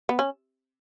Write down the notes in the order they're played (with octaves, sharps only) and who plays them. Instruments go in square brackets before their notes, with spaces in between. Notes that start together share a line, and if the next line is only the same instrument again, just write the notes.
[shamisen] B3
C#4